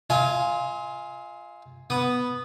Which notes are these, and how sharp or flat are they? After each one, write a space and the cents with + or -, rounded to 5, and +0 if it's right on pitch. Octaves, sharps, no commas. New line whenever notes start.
F4 +0 D#5 +45 G#5 +0
B3 +0 D#6 -10